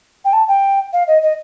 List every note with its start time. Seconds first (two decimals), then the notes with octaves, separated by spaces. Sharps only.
0.25 G5
0.33 A5
0.48 G5
0.93 F5
1.07 D#5
1.22 D#5